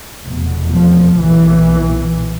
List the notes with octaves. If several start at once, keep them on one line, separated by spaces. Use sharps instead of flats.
F1 E2 B2
F3
B1 A#2 E3